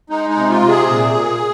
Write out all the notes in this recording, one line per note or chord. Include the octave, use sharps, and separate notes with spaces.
G#3 D#4
D#4
C3
F4
C3
G#4
A#2
A#2